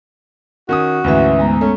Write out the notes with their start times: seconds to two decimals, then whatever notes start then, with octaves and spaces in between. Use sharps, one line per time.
0.69 D#3 C#4 F#4 D#6
1.04 D2 G#2 E3 C#4 B4 E5
1.39 G#3 B3 A#5
1.61 A3 C#4